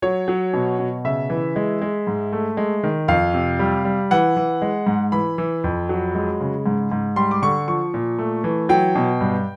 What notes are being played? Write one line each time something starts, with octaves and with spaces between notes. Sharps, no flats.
F#3 C#5
F#3
B2
B2
C#3 E5
E3
G#3
G#3
G#2
A3
G#3
D#3
F2 F5
C3
G3
G3
E3 F#5
E3
G#3
G#2
E3 B5
E3
F2
F#3
G#3
C#3
G#2
G#2
G3 C6
D6
D3 C#6
F3 C#6
A#2
A3
E3
F#3 G5
B2
G2